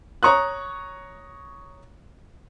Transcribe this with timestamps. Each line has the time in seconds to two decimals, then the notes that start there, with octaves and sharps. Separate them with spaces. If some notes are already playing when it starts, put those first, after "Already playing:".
0.23 C#5 A#5 C#6 D#6 F#6